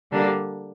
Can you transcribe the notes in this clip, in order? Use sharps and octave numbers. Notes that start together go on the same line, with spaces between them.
D3 G3 A#3 D4